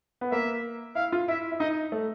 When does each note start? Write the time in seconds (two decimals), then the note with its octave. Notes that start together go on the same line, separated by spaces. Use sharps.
0.21 B3
0.32 A#3 E5
0.95 E4 F5
1.12 F4
1.28 E4 E5
1.52 E4
1.59 D#4 D#5
1.92 A3